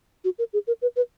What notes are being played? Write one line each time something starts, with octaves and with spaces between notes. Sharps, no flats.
F#4
A#4
G#4
A#4
B4
B4